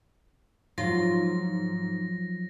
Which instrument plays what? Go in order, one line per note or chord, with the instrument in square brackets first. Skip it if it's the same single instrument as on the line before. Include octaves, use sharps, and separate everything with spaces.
[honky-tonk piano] G#2 [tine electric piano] F3 F#3 [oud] F4 [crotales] A#6